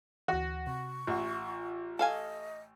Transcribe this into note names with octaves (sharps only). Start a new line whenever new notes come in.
D2 E3 F#4
C3 C#6
A1 F4 F#5
A4 D#5 F5 G#5